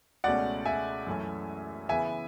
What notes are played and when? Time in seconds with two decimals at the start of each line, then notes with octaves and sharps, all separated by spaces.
0.24 C#2 B2 A3 C#4 D5 F#5
0.65 E5 G#5
1.07 F#2 E3 A3 C#4
1.89 C#3 E3 B3 E5 G#5